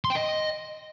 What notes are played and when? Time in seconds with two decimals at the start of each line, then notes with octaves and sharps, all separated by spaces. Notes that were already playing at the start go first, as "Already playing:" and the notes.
0.04 C6
0.10 G5
0.16 D#5